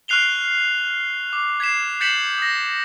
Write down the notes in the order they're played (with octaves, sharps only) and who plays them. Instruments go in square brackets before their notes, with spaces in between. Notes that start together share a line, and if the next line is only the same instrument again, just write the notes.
[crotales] C#6 F6 F#6 C7 F7 G7
D6
G#6 B6 C7 E7
G6 A6 B6 C#7 E7 F#7
D#6 A#6